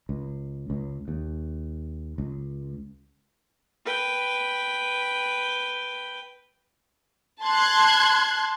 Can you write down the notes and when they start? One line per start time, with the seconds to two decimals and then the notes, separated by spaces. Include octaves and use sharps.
0.09 C#2
0.70 C#2
1.08 D#2
2.18 C#2
3.85 B4 G5
7.42 A5 C6 F#6 G#6